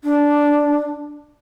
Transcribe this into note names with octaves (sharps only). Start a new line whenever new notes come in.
D4